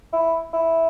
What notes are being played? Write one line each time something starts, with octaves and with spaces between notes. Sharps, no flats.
E4
E4